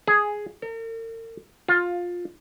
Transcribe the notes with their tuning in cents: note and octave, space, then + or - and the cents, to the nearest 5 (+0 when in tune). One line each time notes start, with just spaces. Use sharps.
G#4 +5
A#4 -45
F4 +15